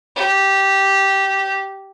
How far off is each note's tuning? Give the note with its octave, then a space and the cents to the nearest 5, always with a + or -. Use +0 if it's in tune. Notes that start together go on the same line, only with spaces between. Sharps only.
G4 -10